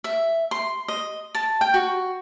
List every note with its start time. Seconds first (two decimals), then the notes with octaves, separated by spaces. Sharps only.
0.04 E5
0.51 C6
0.88 D#5
1.35 A5
1.61 G5
1.74 F#4